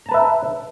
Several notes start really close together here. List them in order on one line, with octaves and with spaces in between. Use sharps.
A#5 A5 B4 E5